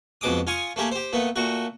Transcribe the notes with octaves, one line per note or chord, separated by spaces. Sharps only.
F2 B2 G#3 D6 D#6
F4 G#5 C#6 D#6
A3 A#3 G4 G#4
G4 C5
A#2 A3 B3
A#2 A3 F#4